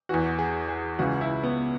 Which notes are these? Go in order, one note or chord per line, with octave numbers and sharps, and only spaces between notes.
E2 E3 F#4
G#4
G#4
C#2 C#3 E3 F#4
E4
B3